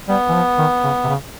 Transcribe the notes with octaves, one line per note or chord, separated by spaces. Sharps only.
G3 B3
E3
F3
D#3
C#3
C3
C#3